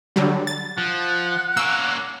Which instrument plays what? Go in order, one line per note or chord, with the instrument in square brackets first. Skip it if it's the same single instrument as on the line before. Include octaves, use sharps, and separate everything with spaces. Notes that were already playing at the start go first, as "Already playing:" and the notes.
[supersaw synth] D3 F#3 G3
A6
[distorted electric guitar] F3 [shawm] F#5
[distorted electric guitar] A#3 C#4 [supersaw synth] E6